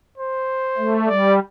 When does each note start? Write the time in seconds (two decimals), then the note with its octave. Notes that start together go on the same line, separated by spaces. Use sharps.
0.18 C5
0.77 A3
1.08 G3 D5